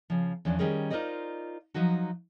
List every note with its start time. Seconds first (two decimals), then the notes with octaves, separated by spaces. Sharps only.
0.10 C#3 F3
0.45 E2 F3 C#4 D4
0.59 D#3 G3 C#4 G#4 A#4
0.90 D#4 F4 A#4 C5 D5 D#5
1.74 F3 F#3 D#4 F#4